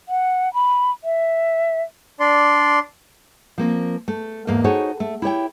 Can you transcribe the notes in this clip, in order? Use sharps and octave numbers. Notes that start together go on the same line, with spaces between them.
F#5
B5
E5
D4 D5 C6
F3 A#3 C4
A3
E2 G#2 A#3 F5
D#4 F#4 G#4 A4 C5 C#5
A3
E4 G4 C#5 G5